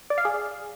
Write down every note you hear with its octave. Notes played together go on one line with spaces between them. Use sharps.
D5
F5
G#4